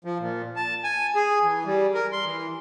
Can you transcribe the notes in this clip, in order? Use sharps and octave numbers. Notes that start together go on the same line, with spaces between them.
F3
A#2
A5
G#5
G#4
E3
G3
A#4
C6
E3